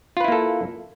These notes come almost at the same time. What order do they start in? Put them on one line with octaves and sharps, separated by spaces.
F4 B4 E4 A#3 A4